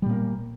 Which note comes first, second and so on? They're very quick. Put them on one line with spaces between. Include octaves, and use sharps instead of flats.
G3 A#2 A#3